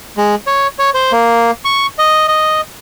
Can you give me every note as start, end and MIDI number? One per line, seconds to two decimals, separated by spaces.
0.17 0.35 56
0.47 0.67 73
0.79 0.90 73
0.94 1.12 72
1.12 1.51 58
1.65 1.86 85
1.99 2.26 75
2.28 2.61 75